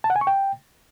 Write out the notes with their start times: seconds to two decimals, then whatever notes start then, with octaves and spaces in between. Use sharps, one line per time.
0.04 A5
0.10 F#5
0.16 G#5
0.21 C#6
0.27 G5